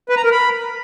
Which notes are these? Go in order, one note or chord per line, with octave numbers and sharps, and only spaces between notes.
B4
A#5
A#4
B5